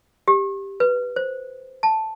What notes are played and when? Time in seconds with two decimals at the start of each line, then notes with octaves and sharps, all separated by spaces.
0.28 G4
0.80 B4
1.16 C5
1.83 A5